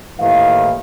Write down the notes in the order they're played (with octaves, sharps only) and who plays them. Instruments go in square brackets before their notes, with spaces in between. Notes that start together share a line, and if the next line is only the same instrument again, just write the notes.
[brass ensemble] D#2 A2 D#3 E3 A#3 F5